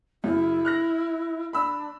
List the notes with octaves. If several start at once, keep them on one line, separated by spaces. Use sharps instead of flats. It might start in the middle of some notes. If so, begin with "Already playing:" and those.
F#2 C#3 E4
F6 F#6 A#6
D4 B5 E6